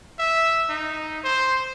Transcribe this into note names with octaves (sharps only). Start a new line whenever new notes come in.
E5
D#4
C5